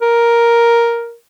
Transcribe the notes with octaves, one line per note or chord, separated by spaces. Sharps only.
A#4